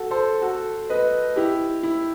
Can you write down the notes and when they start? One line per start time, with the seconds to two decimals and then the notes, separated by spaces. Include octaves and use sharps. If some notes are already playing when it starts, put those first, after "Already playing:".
Already playing: F#4 A4
0.11 A4 C5
0.42 F#4 A4
0.90 B4 D#5
1.36 E4 G4
1.83 E4